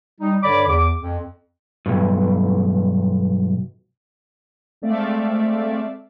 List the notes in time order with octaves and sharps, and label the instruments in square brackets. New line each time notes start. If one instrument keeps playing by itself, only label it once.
[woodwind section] G3 D#4
G2 D3 C#5 D5 B5 D6
E2 D6
F2
[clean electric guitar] B1 G2
[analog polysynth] G#3 A3 C4 D5 E5 F5